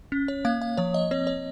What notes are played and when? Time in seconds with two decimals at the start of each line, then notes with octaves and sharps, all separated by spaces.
0.12 C#4
0.28 C#5
0.45 A#3 F5
0.61 F5
0.77 F3 C#5
0.94 D#5
1.11 C4 C#5
1.27 C#5